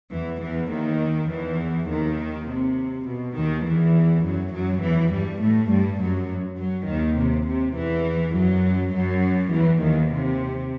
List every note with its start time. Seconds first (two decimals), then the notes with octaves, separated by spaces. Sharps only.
0.13 E2 E3
0.42 E2 E3
0.72 D#2 D#3
1.30 E2 E3
1.89 D#2 D#3
2.49 C3
3.07 B2
3.36 D#2 D#3
3.65 E2 E3
4.25 F#2 F#3
4.53 F#2 F#3
4.83 E2 E3
5.12 G2 G3
5.41 A2 A3
5.71 G2 G3
6.00 F#2 F#3
6.59 F#2 F#3
6.88 D#2 D#3
7.18 C3
7.47 C3
7.76 E2 E3
8.35 F#2 F#3
8.94 F#2 F#3
9.52 E2 E3
9.82 D#2 D#3
10.11 C3